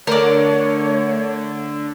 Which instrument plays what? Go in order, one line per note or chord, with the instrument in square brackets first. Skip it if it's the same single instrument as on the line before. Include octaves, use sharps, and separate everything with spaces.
[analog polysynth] D3 [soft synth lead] A3 [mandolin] A#4 D5 [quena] C#5